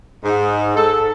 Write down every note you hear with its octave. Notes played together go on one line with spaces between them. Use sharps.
G#2
A4